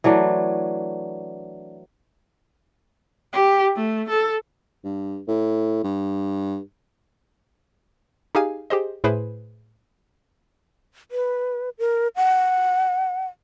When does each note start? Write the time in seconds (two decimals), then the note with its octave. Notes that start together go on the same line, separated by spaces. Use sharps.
0.04 E3 F#3 A3 D4
3.33 G4
3.75 A3
4.09 A4
4.84 G2
5.28 A2
5.84 G2
8.35 D#4 G4 G#4 F5 G#5
8.70 G4 G#4 C5 D#5
9.04 A2 E4 G#4 B4 C5
11.11 B4
11.79 A#4
12.16 F#5